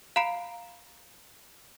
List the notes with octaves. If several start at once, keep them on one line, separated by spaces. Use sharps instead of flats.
F5 A#5 B5 C7 D7